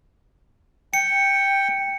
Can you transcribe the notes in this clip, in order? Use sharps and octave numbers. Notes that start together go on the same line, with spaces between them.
G5 C#7